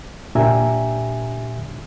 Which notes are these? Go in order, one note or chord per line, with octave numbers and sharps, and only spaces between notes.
A#2 D4 G4 E5 G#5 A#5